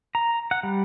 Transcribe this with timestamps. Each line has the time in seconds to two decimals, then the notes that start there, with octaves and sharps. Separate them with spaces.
0.15 A#5
0.51 F#5
0.63 G3